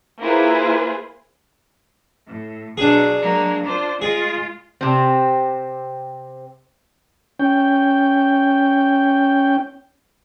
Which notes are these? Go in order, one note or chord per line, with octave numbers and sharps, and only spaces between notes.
A#3 E4 F4 G#4 B4 C5
A2
B2 F#3 D4 G#4
F#3 G#3 A#3
D4 F4 C5
G#3 F4 G#4
C3 C4
C#4 G5